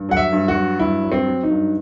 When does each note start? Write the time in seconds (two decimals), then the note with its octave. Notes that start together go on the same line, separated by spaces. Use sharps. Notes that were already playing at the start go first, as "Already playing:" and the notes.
Already playing: G2
0.09 F#3 F#5
0.17 E5
0.32 G2
0.48 F#4
0.56 F#3
0.79 G2 E4
1.03 F#3
1.12 C4
1.28 F#3
1.43 D#4
1.51 G2